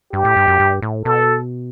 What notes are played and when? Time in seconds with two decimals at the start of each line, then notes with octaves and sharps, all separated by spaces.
0.13 G2 G4
0.25 A2
0.37 G2
0.48 F#2
0.60 G2
0.82 A2
1.05 B2 A4